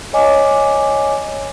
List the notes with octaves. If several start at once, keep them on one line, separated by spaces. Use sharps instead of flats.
C#5 D#5 G#5 D6